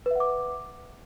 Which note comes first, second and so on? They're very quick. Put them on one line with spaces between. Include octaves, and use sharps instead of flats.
B4 E5 F#5 D6